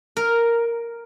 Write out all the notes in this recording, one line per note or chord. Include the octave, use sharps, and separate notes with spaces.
A#4